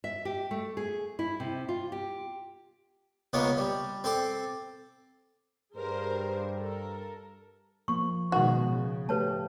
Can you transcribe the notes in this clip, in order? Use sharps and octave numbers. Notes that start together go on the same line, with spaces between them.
E5
G4
A3
G#4
E4
C3
F4
G4
C#2 C#3 G#3 A#3 B3 C#4
G3
C4 A4 C6 D6
G2 G#4 A#4 C5
A4 A#4
F3 A#3 C#6
B2 D#3 G#3 F#4
C#3
A3 G4 B4 C#5 A5